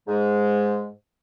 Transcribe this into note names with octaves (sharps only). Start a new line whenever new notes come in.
G#2 G#3